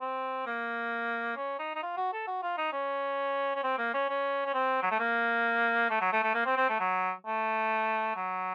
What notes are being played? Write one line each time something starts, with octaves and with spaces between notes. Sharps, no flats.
C4
A#3
C#4
D#4
D#4
F4
F#4
A4
F#4
F4
D#4
C#4
C#4
C4
A#3
C#4
C#4
C#4
C4
F#3
A3
A#3
A3
F#3
A3
A3
A#3
C4
C4
A3
F#3
A3
F#3